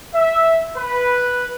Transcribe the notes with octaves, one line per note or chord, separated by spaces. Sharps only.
E5
B4